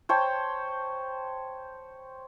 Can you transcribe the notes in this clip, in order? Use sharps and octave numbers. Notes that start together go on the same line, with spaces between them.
C5 C#5 G5 A5